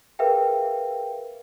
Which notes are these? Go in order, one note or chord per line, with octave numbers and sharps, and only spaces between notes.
G#4 A#4 B4 E5 F5 G5